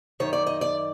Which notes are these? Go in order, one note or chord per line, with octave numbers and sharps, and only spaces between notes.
F#2 D#3 C#5
D5
D#5
D5